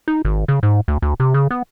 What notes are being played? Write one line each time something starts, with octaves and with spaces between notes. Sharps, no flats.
D#4
G#1
C#3
G#2
D2
D2
C3
C#3
B3